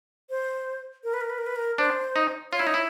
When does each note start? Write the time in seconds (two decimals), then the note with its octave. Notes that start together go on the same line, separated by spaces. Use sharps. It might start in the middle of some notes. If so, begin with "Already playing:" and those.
0.30 C5
1.04 A#4
1.13 B4
1.21 A#4
1.30 B4
1.38 A#4
1.47 B4
1.56 A#4
1.78 D4 C5
2.16 D#4
2.52 F4 C#5
2.59 E4
2.67 D#4
2.74 E4